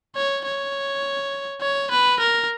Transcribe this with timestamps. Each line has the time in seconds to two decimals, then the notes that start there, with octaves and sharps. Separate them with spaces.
0.16 C#5
0.45 C#5
1.61 C#5
1.91 B4
2.20 A#4